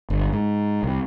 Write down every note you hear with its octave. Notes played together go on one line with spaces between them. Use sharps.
G1
G#2
C2